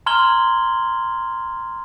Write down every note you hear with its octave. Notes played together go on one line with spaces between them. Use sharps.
A#5 C6 F6 G#6 F#7 G7